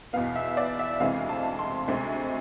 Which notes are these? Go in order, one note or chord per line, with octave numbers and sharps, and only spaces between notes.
E2 B2 B3 F5
E5
D5
E5
D2 C3 E3 G#3 C4 F5
A5
C6
D2 C3 G#3 C4